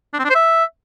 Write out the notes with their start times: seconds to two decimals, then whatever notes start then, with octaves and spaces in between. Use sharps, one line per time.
0.14 D4
0.19 C4
0.24 D4
0.30 C5
0.35 E5